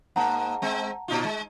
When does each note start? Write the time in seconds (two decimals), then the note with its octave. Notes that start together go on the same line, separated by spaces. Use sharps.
0.16 G#2 A#3 F#5 A5 A#5
0.62 G#3 C4
1.08 A#2 D#4 F4
1.25 G#3